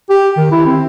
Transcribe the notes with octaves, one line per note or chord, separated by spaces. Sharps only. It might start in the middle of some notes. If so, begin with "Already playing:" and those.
G4
D#3
E4
C4